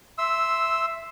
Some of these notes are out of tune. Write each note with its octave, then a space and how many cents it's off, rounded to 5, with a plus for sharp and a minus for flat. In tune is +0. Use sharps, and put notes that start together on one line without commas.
E5 +5 C6 +0 E6 -5